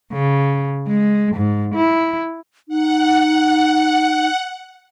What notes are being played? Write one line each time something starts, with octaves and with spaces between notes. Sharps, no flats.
C#3
G#3
G#2
E4
D#4 F#5